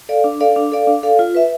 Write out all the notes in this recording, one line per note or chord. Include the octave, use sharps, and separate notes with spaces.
A4 D5 F5
D4
A4 D5 F5
D4
A4 D5 F5
D4
A4 D5 F5
F4
B4 E5